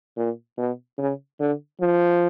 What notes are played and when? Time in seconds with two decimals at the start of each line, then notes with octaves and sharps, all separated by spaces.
0.17 A#2
0.57 B2
0.98 C#3
1.39 D3
1.81 F3